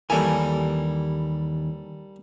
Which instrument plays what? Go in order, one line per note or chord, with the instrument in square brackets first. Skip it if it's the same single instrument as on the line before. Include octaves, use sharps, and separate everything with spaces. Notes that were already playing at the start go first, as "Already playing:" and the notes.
[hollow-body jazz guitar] D#2 E3 G#5 [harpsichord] G3 A4 A#4